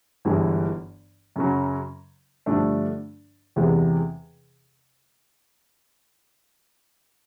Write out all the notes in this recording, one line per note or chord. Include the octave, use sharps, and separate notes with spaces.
G1 G2 E3 G#3
F#2 C#3 F#3
G2 D3 F3 A3 D4
E2 C3 E3 G#3